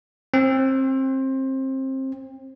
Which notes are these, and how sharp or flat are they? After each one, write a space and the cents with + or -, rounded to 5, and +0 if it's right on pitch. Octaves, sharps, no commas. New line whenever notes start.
C4 +25